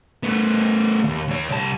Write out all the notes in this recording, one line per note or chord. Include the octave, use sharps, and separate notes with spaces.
A3 B3
D#2
D#2 C#5
C2 A5